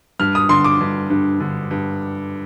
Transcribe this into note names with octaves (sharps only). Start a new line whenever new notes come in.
G2 F6
D#6
D3 C6
D6
G2
G2
D3
G2